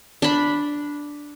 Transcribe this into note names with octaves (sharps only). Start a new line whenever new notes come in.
D4 B5